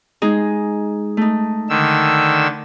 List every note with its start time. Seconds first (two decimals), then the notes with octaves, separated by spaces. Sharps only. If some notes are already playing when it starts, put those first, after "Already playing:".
0.22 G#3 D#4 G#4
1.17 A3 D#4
1.69 D3 D#3 E6